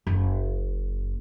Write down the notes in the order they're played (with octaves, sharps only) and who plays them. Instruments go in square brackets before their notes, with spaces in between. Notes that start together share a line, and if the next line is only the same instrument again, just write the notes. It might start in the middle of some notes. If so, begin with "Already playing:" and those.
[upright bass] F#1